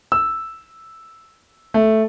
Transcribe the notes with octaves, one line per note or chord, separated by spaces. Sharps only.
E6
A3